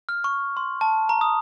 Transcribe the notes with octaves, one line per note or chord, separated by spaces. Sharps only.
F6
C#6
C6
A5
A#5
D#6